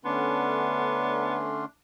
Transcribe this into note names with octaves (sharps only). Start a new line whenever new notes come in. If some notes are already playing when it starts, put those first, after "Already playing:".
D3 A3 B3 C#4 D4 C6